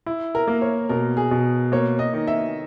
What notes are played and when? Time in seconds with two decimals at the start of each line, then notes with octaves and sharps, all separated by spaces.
0.06 E4
0.35 A#4
0.48 A#3
0.62 C#5
0.89 B2 A#4
1.17 G#4
1.31 B2
1.72 A#3 C#5
1.99 D#5
2.14 D#3
2.27 E5